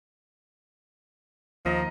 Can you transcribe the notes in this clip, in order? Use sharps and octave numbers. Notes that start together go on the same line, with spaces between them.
D#2 F3 D#5 A#5